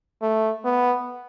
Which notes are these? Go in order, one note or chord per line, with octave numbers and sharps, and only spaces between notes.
A3
B3